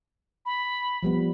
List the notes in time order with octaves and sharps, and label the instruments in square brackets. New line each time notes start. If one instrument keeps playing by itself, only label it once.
[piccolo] B5
[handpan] F3 G3 B3